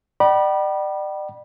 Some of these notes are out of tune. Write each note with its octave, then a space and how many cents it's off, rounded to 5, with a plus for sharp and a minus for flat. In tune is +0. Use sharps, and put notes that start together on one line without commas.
D5 +35 G5 -40 B5 -25